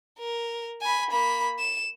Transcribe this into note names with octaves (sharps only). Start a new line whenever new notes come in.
A#4
G#5 B5
A#3 B5
E7